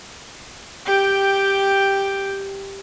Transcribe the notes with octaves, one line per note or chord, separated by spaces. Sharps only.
G4 G5